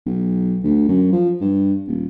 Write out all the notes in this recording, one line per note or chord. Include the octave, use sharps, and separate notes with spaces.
B1
D2
F#2
F3
G2
D#1